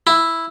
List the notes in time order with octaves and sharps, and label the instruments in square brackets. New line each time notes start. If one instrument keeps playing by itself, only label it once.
[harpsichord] E4